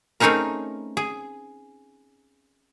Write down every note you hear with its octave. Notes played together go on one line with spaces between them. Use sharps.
A3 C4 C#4 D#4 G#4 A#4
G#4